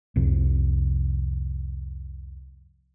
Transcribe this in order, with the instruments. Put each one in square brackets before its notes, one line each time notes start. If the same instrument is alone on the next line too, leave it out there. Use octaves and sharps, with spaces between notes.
[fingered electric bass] C2 F2 C3